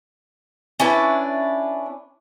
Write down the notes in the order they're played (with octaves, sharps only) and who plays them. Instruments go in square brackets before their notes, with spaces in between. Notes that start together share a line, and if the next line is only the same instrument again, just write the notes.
[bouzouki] C#4 D4 E4 B4